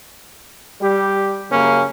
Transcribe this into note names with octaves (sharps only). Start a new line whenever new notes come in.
G3 G4
F#2 C#3 A#3 C#4